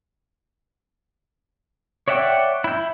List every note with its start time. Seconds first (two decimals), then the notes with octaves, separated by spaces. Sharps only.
2.08 C#5 D5 E5 F#5 G5
2.64 E4 G6